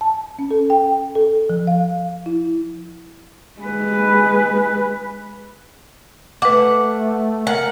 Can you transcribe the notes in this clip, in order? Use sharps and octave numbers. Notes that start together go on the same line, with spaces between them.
A5
C#4
A4
G5
A4
F3
F5
E4
G#3 B4
A3 B4 F#5 D6
A#4 F#5